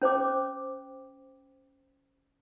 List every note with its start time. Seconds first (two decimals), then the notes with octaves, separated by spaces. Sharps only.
0.02 C#4 C5 G5 D6